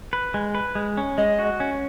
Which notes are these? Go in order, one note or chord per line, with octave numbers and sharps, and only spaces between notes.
B4
G#3
B4
G#3
C#4
G#3 D#5
F#4
C#4